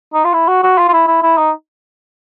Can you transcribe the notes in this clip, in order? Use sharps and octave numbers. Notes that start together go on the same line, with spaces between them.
D#4
F4
E4
F#4
F#4
F4
F4
E4
E4
E4
D#4